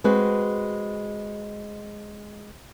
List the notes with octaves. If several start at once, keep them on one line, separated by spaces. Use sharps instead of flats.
G#3 C4 F#4 B4